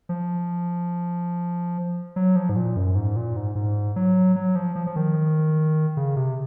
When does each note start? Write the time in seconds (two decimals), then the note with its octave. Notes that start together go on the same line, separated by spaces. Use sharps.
0.09 F3
2.16 F#3
2.36 F3
2.49 G#2
2.56 A#2
2.76 F#2
2.95 G#2
3.16 A#2
3.36 G#2
3.55 G#2
3.96 F#3
4.36 F#3
4.56 F3
4.75 F3
4.87 F3
4.96 D#3
5.97 C#3
6.16 C3